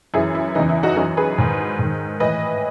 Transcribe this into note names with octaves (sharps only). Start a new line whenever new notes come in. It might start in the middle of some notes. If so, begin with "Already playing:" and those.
F#2 E3 E4 G#4
E4
E2 C#3 E3 D#4
E4
D#4 F#4
F#2 E3 D#4 F#4
G#4 B4
G#2 D#3
G#2 D#3
A2 E3 B4 D#5